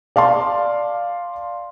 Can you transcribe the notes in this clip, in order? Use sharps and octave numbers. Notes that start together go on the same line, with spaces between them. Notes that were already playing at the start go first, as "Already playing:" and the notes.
D5 F5 A5 C6